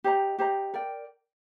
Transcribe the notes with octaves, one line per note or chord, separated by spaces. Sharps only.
G4 C5 D#5 A#5
G4 C5 D#5 A#5
A#4 D5 G5